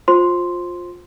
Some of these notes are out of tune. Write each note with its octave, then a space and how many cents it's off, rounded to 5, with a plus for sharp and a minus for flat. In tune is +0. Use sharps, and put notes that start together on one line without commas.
F4 +20 C5 +15 C6 +0